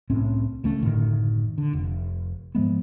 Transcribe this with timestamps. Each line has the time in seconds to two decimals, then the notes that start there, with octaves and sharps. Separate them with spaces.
0.10 C2 A2 C4 C#4
0.64 C#2 A3 C#4
0.82 F#1 A2 D3 D#3
1.58 D3
1.73 F1
2.55 G#2 F3 G#3 B3